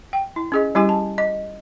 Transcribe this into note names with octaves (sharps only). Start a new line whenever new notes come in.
G5
E4
C#4 G#4 D#5
G3 C#4 E4 G4 D#5 G#5
A5
D#5